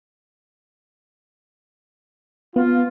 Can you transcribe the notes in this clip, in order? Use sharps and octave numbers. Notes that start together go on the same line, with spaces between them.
B3 F4